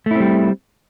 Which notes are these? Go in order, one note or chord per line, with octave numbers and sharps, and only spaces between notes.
G3 A3 C4 E4